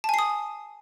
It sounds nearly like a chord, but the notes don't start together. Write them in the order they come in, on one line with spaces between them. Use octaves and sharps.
A5 G#5 C7 D#6